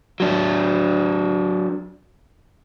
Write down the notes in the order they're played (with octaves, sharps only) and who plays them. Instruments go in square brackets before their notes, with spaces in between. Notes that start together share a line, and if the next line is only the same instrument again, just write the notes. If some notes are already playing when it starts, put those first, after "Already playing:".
[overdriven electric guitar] F#3 D4